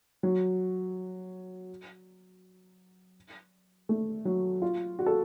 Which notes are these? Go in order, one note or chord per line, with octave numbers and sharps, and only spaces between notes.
F#3
A3
F#3
F4
F#4
A4